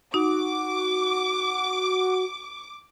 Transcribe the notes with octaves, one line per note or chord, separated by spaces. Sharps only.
D#4 F#4 D6